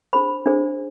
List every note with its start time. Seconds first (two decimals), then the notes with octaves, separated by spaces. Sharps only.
0.13 D4 G#4 C5 B5
0.46 D4 G#4 C5